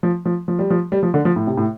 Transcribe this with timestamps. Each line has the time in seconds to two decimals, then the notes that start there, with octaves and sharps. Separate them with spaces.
0.03 F3
0.26 F3
0.48 F3
0.59 G3
0.70 F3
0.92 G3
1.03 F3
1.14 D3
1.25 F3
1.36 A2
1.47 C3
1.57 A2